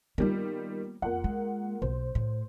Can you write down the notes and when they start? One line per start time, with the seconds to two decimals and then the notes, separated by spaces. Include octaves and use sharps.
0.18 D#3 G3 A#3 B3 F4
1.02 F2 A#3 F4 F#5
1.24 G#3
1.82 B1 C5
2.15 A2